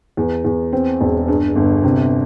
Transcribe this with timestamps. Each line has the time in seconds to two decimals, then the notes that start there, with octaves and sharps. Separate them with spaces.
0.17 E2
0.45 E2
0.73 C4
1.01 E1
1.28 G2
1.55 G1
1.84 C3